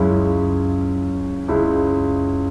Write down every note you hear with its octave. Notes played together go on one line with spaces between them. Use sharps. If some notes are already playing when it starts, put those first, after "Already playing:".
Already playing: C#2 F#2 C#3 G#3 C#4 E4
C#2 C#3 G#3 C#4 E4